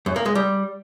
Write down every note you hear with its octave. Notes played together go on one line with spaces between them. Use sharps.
F#2
A#3
G#3
G3